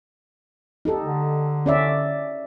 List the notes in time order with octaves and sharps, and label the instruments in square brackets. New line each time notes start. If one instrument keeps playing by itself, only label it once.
[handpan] D#4 G4 A4
[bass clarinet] D3
[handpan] C#4 D5 E5